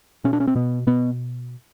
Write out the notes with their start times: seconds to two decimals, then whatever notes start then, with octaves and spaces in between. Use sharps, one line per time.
0.24 B2 C#4
0.33 D4
0.40 C#4
0.47 C4
0.55 B2 B3
0.87 B2 B3